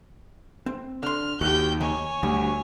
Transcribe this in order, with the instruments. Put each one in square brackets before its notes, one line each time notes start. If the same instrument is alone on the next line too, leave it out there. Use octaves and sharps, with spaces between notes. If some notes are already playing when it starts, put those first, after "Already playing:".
[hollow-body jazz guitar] C4
[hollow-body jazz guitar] D3 C6 [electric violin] F6
[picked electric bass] D#2 [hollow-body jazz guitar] F#4 G4 [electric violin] G5 G6
[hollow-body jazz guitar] D#3 [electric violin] C#5 G#5
[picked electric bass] D2 [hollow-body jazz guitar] G3